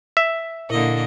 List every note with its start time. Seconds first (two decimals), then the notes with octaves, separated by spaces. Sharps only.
0.17 E5
0.70 A#2 D3 A#3 E4 D#5